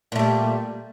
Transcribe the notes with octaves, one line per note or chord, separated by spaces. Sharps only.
A#2 G3 A3